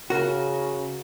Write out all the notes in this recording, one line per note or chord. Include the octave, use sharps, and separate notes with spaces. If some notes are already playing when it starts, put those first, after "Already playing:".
C#3 F#4 A#4